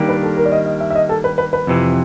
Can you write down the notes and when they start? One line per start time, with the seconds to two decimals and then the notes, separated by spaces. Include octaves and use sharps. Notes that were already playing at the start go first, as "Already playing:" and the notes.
Already playing: D#3 G3 A#3 D4 G4
0.09 B4
0.23 A4
0.37 A#4
0.45 D5
0.52 D#5
0.66 D#5
0.80 E5
0.90 E5
0.95 D#5
1.09 A4
1.24 B4
1.38 B4
1.53 B4
1.67 F2 C3 E3